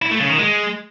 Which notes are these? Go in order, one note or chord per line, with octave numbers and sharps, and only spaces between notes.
E4
A3
C#3
D#3
G#3